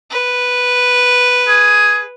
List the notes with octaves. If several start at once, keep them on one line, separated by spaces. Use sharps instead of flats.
B4
G#4